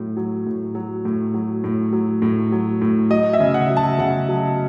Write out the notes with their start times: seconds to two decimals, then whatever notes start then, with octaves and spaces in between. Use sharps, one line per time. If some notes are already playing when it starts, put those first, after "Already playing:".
Already playing: A2 F#3
0.17 F#3
0.47 A2
0.75 F#3
1.05 A2
1.34 F#3
1.64 A2
1.93 F#3
2.22 A2
2.52 F#3
2.82 A2
3.10 F#3 D#5
3.33 E5
3.40 C#3
3.54 F#5
3.70 F#3
3.77 A5
3.98 C#3 F#5
4.29 F#3